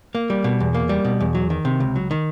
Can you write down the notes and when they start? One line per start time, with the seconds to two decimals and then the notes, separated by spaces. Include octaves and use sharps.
0.15 A#3
0.30 G3
0.44 B2
0.60 E2
0.74 A#3
0.89 G3
1.05 B2
1.20 E2
1.35 F#3
1.50 D#3
1.65 C3
1.80 C#2
1.96 F#3
2.11 D#3